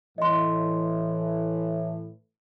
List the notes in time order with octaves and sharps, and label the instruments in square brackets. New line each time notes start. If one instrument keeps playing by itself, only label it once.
[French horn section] A2 E3 [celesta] D#5 C6